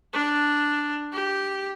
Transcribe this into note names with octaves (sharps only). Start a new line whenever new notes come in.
D4
G4